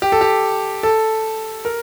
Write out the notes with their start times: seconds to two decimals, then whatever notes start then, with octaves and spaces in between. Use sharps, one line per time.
0.02 G4
0.12 A4
0.21 G4
0.83 A4
1.65 A#4